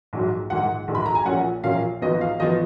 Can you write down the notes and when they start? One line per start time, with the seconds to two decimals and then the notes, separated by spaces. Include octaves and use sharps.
0.13 A#1 G#2 F#3
0.50 A#1 G#2 D#3 G#3 F#5
0.88 A#1 G#2 D#3 G#3
0.95 B5
1.06 A#5
1.15 G#5
1.25 A#1 A#2 F3 A#3 C#4 F#5
1.64 A#1 A#2 F3 A#3 C#4 F5
2.01 G#1 G#2 F3 B3 D#5
2.21 F5
2.40 G#1 F3 B3 D#5